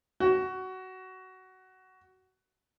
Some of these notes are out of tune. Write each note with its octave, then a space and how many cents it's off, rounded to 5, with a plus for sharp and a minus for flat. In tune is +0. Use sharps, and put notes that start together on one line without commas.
F#4 +15